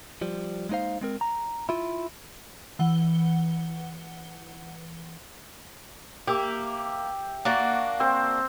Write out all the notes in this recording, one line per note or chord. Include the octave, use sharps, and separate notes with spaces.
F3 G3
G#3 A#3 D#4 C5 F5
G#3 C4 A#4
A#5
E4 F4
E3 F#5 G7
A#3 G4 E5
A#3 D4 F#4 F#5
C4 C5